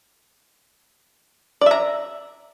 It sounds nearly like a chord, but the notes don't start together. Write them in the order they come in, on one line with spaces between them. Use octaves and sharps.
D5 E5 A#5